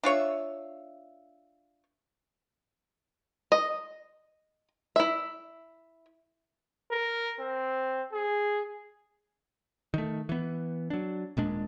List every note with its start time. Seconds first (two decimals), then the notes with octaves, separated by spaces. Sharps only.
0.03 D4 F4 C#5 E5
3.52 D#5
4.96 E4 E5
6.92 A#4
7.40 C4
8.13 G#4
9.94 D#3 A3
10.29 E3 B3
10.90 F#3 D4
11.37 D#1 A#2 G#3 D4